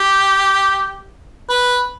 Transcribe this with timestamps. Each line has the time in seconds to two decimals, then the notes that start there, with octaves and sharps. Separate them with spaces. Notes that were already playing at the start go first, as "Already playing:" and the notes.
Already playing: G4
1.49 B4